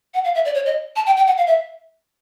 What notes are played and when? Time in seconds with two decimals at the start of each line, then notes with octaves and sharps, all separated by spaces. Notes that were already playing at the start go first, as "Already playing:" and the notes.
0.14 F#5
0.24 F5
0.35 E5
0.45 D5
0.55 C#5
0.66 D#5
0.96 A5
1.06 G5
1.17 G5
1.27 F#5
1.37 F5
1.47 E5